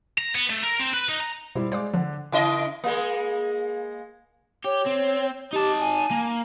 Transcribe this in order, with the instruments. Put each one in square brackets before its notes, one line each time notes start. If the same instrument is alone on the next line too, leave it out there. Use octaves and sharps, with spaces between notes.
[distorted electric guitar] A#5
B3
A3
A#4
C4
B4
D#4
A#5
[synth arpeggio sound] B2 [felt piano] G3 E4 C5
[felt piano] G#3 D5 [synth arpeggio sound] C5 F5 D6
[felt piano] D3 D5 F#5 [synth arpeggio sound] F3
[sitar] C#3 E4 D#5
G#3 A#3
[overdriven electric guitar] G4 [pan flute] C#5
[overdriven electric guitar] C4
[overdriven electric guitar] D#4 A5 [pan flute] G4
[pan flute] G#5
[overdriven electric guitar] A#3